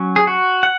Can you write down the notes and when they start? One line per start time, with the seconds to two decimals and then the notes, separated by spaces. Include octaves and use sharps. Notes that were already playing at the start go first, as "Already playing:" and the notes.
Already playing: F#3 C#4
0.16 G#4
0.27 F#4
0.63 F#5